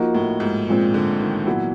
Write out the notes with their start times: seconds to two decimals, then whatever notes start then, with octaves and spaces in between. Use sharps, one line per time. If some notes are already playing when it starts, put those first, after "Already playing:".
Already playing: F3 A#3 D#4 F#4
0.14 A2
0.40 G#2
0.67 A#2 F3 G#3 C4
0.94 D3
1.21 D#3
1.46 A#2 E3 F#3 B3 E4